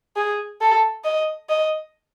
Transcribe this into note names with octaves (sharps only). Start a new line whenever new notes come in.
G#4
A4
D#5
D#5